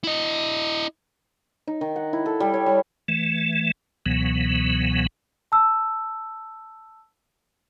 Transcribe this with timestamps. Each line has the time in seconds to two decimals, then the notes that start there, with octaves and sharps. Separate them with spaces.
0.04 E4 D#5
1.67 D#4
1.81 D#3
1.96 F#5
2.13 E4
2.26 A4
2.40 G3
2.54 C#5
2.66 G3
3.08 E3 A3
4.06 C#2 B2 E3 F#3 B3
5.52 A5 E6